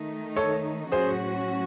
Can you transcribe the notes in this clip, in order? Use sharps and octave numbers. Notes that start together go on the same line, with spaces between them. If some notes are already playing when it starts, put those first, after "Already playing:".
Already playing: D#3 A3 D#4
A4 C#5
A2 F#3 C#4 F#4 G#4 C5